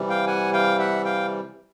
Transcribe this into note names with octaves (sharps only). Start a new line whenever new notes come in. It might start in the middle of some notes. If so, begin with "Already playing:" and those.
Already playing: C3 E3 G3
F5 G5
F#5 G#5
F5 G5
E5 F#5
F5 G5